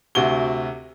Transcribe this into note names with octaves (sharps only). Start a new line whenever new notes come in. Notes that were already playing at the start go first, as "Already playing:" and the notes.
D2 C3 F#4 G7